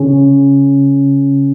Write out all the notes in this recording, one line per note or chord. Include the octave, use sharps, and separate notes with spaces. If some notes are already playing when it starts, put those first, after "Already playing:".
Already playing: C#3 C#4